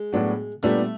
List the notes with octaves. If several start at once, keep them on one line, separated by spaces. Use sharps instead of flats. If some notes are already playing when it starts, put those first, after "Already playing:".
Already playing: G#3
A2 F#3 B3 D4 F#4
A#2 G3 A3 B3 D4 G4